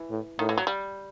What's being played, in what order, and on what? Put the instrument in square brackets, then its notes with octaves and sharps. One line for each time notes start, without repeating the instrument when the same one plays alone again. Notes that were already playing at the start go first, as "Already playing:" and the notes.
Already playing: [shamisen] E3
[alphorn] A2
[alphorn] A2 [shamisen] D#3
[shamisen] E3
F#3
G3